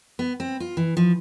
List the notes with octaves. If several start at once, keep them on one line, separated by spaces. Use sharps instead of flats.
B3
C4
F4
E3
F3